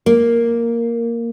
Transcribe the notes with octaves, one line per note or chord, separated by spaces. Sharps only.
A#3